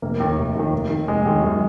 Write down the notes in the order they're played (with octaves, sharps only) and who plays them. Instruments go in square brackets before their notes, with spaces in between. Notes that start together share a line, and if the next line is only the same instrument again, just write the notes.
[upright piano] F1 [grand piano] A#3
[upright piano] D#2 D#3
F1
D#2 D#3
F1
D#2 D#3
[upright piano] F1 [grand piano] G#3
[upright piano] D#2 D#3
F#2